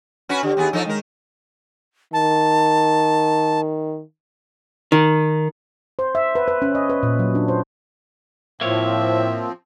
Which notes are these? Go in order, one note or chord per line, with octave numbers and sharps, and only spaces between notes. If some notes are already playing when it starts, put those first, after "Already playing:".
C#4 F#4 B4
D3 G4
D#2 B3 G#4
F3 D#4 A4
D#3 G#3 A#4
D#3 A5
D#3
C5
E5
B4
B4
C#4
D#5
B4
A#2
F#3
D4
C5
A2 F3 A#3 C4 C#5 E5